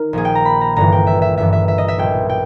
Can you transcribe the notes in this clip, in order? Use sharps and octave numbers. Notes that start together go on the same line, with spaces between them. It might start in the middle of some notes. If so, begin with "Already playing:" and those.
Already playing: D#3 A#4
A#1 A#2 G#4
G5
A#5
B5
A#5
G1 G2 E3 A#5
G5
E5
E5
G1 G2 E3 E5
E5
E5
D#5
E5
B1 A#2 G5
G5